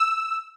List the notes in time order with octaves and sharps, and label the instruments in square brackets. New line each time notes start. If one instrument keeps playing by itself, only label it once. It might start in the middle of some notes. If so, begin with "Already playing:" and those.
Already playing: [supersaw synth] E6